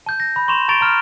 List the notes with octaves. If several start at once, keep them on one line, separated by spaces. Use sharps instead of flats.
A5 G6
A#6
B5
C6 C#6 E7 F7
A#5 C#6 A6 D7 F7 G7
A#5 F6